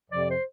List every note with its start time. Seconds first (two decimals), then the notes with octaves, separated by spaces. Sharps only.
0.10 F2 C3 F3 D5
0.28 C5